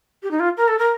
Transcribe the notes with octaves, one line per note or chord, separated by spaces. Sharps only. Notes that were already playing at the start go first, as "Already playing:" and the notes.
G4
D#4
F4
A#4
A4
A#4